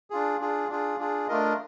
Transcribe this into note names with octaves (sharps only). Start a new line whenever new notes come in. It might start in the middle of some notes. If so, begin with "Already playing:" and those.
D4 F4 G#4
D4 F4 G#4
D4 F4 G#4
D4 F4 G#4
A3 D4 F4 A#4 D#5